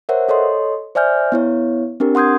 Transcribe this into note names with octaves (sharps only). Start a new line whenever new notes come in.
A#4 C5 C#5 E5 F#5
A4 C#5 D#5 C6
C5 D5 E5 G#5 F6 G6
B3 E4 C#5
C4 D4 G4 A#4
F#5 C6 D#6 G6 G#6